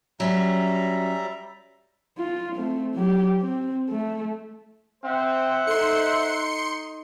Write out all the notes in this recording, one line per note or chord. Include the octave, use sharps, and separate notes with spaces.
F#3 G3 C#4 F#4 E5 A#5
F4
A3 C4
F#3 G4
C4
A3
C4 C5 E5 F#5
D#4 A4 C6 C#7